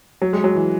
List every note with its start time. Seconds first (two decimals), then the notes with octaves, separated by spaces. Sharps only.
0.22 F#3
0.33 G#3
0.44 F#3
0.55 E3